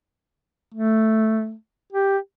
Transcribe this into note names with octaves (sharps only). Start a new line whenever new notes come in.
A3
G4